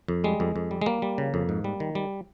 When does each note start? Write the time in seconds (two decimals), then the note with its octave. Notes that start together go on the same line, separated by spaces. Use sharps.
0.08 F2
0.24 G3 G#3
0.40 F2
0.56 F2
0.71 G3
0.81 G#3
0.86 G3 A#3
1.02 G3
1.18 C#3
1.34 F2
1.49 G#2
1.64 G3
1.80 D#3
1.95 G3